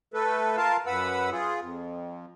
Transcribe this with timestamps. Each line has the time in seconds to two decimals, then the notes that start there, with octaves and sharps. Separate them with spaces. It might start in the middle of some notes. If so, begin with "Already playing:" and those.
0.14 A3 A4 B4
0.57 F4 A#4 F5 A5
0.87 F#2 B4 F#5 B5 E6
1.31 F4 G#4
1.61 F2